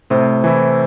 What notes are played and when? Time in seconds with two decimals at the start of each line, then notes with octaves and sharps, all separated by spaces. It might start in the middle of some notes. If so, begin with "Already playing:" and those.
0.10 A2 C3
0.44 E3 A3 E4